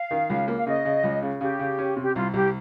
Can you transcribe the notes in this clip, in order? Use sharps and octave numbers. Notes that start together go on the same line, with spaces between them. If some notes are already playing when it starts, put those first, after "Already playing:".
Already playing: F5
D#3
C#2
A#3
F5
C#3 D#5
C#3
C#2
C#3
C#3 G4
C#3
C#4
C3
G4
C2 F4
C2 G4